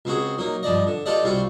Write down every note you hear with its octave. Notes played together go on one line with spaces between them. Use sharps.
C#2 C4 F#4 G#4
F#3 A#3 D#4
G2 F3 D5 D#5
D3
F4 G4 A4 B4 D5 D#5
C2 G3 C4 F4 F#4